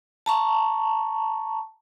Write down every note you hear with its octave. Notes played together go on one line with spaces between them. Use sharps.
A5 A#5 C#6